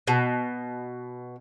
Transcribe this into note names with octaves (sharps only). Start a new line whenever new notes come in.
B2